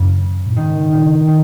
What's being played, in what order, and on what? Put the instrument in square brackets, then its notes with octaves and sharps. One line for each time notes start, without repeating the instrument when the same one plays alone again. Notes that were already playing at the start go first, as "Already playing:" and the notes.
Already playing: [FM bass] F#2 [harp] C#3
[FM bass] A#2
[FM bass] G#2 [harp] D#3
[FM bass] A#2 [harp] D#3
[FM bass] C#3
B2
[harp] D#3